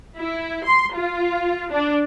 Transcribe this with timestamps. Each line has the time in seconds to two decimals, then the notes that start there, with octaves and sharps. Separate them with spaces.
0.17 E4
0.65 C6
0.95 F4
1.71 D4